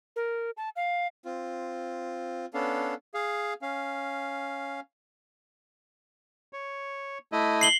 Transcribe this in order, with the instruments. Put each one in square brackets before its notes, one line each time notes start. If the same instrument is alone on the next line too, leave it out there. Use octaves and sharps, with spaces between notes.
[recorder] A#4
A5
F5
[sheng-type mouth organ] C4 F4
B3 C#4 D4 A4 F5
[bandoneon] G#4 F5
C#4 F5
[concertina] C#5
A3 E4 D#5
[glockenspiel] C7 F#7 G7